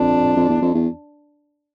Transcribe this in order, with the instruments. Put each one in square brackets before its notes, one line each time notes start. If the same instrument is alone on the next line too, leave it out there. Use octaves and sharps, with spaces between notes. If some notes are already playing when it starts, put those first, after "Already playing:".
Already playing: [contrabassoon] F2 [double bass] D4
[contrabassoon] F2
E2
F2
E2